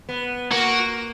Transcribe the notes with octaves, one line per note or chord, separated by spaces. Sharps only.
B3
A#3 F#4